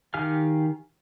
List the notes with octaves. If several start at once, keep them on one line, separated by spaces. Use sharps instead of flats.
D#3 G4 F5 G#5 F6